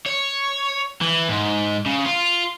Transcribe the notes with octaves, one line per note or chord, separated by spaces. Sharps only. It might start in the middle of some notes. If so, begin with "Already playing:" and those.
C#5
E3
G#2
C#3
F4